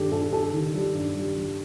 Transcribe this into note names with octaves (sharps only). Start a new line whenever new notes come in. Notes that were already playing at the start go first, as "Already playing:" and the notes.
Already playing: G2 D#3 G4 A4
G2 A4
G2 A4
D#3
G3
G2
G3
G3